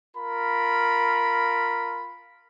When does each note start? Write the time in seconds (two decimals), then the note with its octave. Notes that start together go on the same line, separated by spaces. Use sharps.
0.16 F4 A#4 B5